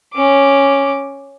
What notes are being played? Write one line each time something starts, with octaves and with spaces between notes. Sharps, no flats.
C#4 D6